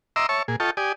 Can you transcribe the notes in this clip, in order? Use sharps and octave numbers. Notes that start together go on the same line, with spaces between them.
D#5 E5 A#5 C6 D6 E6
C#5 E5 A5 C#6
A#2 G#4
F4 A4 D#5 G5 A5 C#6
G4 D5 G#5 D#6